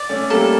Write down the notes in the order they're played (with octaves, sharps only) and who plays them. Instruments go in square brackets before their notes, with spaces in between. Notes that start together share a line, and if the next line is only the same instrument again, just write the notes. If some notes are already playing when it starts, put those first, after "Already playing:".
Already playing: [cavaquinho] D5
[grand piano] A3 C#4
[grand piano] G3 A#3 [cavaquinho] A4